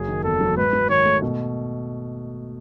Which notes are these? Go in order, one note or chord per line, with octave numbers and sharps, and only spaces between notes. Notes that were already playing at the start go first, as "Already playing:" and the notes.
Already playing: F#1 F#3 G#4
D#3
E2 A4
F#3
G#2 B4
F#3
D#3 C#5
A3
B2